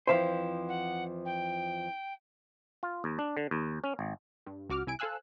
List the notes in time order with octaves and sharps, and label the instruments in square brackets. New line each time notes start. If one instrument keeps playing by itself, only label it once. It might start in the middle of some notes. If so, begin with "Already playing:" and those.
[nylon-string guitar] F2 E3 F3 [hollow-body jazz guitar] C5 E5 F5
[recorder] F#5
G5
[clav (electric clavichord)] F4
D#2
D4
D3
D#2
C#4
G#1
[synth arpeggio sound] G2
C#2 F#4 D6 F6
C2 E4 G#5 D7
A4 C5 F5 G#5 E6 F#6